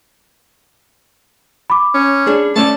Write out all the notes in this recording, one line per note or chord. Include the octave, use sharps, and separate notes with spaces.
B5 D6
C#4
D4 G#4
A3 C#4 D5 A5